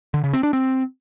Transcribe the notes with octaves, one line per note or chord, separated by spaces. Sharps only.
D3
C#3
C4
D4
C4